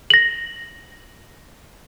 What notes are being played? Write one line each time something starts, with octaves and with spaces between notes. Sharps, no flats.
A#6 F#7